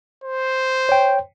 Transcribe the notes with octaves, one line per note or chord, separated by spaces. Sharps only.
C5
C#5 G5